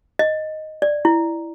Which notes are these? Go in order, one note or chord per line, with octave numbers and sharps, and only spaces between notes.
D#5
D5
E4